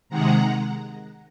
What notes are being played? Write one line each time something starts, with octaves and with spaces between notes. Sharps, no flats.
C3 D#3 G#3 F#5 A#5